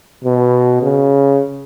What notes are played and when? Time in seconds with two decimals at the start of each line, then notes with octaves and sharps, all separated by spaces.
0.24 B2
0.82 C#3